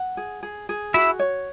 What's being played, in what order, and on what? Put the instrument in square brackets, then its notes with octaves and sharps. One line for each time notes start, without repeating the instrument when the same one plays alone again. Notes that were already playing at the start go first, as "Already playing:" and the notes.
Already playing: [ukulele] F#5
G#4
G#4
G#4
[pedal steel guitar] E4 E5 [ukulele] F#4
[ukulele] C#5